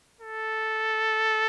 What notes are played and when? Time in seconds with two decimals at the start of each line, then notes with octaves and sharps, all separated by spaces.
0.21 A4